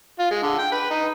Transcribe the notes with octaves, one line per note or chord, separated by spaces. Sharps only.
F4
G#3
D3
G5
B4
D#4